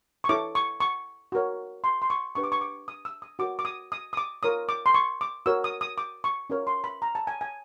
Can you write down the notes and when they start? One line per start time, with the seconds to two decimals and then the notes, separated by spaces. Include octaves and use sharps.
0.24 C#6
0.29 E4 A4 C#5 D6
0.55 C#6
0.80 C#6
1.32 F#4 A#4 C#5
1.84 C6
2.02 C6
2.10 C#6
2.35 D4 G4 B4 C#6
2.44 D6
2.52 C#6
2.61 D6
2.88 D#6
3.05 E6
3.22 D#6
3.39 F#4 A#4 C#5 D6
3.59 D6
3.65 D#6
3.92 D#6
4.13 D#6
4.17 D6
4.43 F4 A#4 C#5 D#6
4.69 D6
4.86 C6
4.95 C#6
5.21 D6
5.46 F#4 A#4 C#5 E6
5.64 D#6
5.81 D#6
5.98 D6
6.24 C#6
6.50 C#4 F4 A#4 C#5
6.67 C6
6.84 B5
7.02 A#5
7.15 A5
7.27 G#5
7.41 G#5